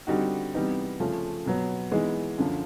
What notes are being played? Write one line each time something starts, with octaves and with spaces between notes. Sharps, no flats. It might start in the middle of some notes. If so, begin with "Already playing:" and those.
D3 G3 C4 D#4 F#4
C3 E3 G3 B3 D#4
C#3 F3 A3 C#4 F4
B2 F#3 B3
E3 G#3 B3 D#4
F#2 D3 F3